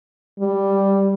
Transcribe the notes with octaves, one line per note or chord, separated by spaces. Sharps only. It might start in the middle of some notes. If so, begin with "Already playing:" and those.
G3